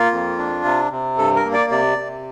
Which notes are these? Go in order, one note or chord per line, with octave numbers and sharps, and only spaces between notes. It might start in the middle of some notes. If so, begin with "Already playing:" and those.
Already playing: A#3 F4
F2
D4
C3
C3
G2 A4
A#4
A#3
D5
C3 D5
C3